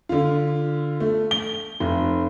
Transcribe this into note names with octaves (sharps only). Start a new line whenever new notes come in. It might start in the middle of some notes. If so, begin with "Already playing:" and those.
D3 F4
A3
G7
F1